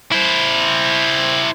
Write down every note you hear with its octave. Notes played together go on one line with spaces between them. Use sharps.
E4 C5